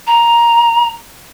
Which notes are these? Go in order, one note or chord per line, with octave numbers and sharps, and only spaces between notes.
A#5